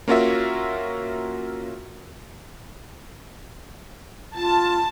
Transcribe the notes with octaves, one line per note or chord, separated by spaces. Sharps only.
A#3 C#4 F4 F#4 A#4 E5
F4 A5